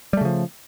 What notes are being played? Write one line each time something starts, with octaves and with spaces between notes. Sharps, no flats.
C#3 F3 G3 A3